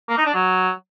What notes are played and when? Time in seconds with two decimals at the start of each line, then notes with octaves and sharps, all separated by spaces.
0.09 A#3
0.17 D#4
0.26 D4
0.34 F#3